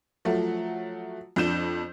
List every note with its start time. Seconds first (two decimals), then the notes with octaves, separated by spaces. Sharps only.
0.25 F3 F#3 A3
1.36 F2 D4 G6 E7